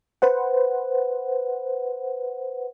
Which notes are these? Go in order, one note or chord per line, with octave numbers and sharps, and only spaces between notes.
B4 C5 F#5